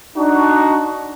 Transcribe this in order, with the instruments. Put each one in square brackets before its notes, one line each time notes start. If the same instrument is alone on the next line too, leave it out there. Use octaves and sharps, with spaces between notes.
[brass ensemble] D4 D#4 F#4